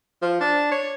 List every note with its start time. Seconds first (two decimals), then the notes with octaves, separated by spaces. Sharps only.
0.22 F3
0.40 D4
0.71 C#5